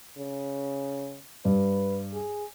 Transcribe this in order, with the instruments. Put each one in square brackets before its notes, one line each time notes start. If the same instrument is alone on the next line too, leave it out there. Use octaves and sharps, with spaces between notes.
[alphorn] C#3
[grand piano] G2 [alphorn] B4
[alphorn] G#4